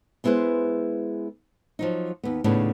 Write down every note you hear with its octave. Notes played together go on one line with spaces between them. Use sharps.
G#3 B3 E4 G#4 B4 C5
F3 F#3 D#4
D#2 B3
D#2 A2 C#3 B3 D4